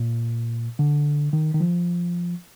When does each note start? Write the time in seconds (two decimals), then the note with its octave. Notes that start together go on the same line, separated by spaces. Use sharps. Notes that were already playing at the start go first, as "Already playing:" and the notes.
Already playing: A#2
0.79 D3
1.33 D#3
1.54 D#3
1.60 F3